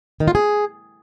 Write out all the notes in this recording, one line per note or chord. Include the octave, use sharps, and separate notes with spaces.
D#3
F4
G#4